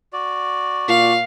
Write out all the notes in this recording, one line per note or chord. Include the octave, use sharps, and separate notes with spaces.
F#4 D5
A#2 F5